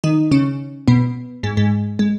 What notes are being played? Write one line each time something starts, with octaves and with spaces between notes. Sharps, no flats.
D#3 D#4
C#3 C#4
B2 B3
G#2 G#3
G#2 G#3
G#3